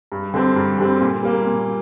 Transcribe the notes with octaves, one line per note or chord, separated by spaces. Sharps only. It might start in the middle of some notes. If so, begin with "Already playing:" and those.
G2
D3 G3 C4
G2
D3 G3 C4
A#2
G3 A#3
A#2